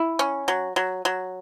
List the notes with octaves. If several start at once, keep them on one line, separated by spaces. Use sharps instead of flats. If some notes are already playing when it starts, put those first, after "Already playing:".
Already playing: E4
C#4
F#3
F#3
F#3